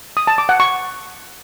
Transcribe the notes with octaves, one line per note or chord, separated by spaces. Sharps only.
D#6
A5
D6
F#5
C#6